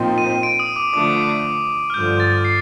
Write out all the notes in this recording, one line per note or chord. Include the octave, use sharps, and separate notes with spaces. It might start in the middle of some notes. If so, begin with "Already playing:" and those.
Already playing: A#2 F3 C4 D#4
D#7
D7
D#6
D6
D3 F3 A3 D4 D6
F6
G2 D3 F3 G6
A6
C7